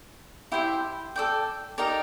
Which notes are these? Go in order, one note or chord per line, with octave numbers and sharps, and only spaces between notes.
E4 G4 C5 E5
A4 D5 G5
D#4 G4 A#4 D5